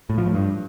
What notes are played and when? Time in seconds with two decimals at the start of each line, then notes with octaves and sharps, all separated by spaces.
0.10 A2
0.18 F3
0.26 A2
0.34 G2